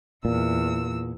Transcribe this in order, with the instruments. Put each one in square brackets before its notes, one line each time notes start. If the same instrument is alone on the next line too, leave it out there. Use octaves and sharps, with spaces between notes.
[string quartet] E2 E6 [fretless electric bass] A#2